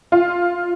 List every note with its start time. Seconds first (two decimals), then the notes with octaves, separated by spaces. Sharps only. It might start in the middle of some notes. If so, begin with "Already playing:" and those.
0.12 F4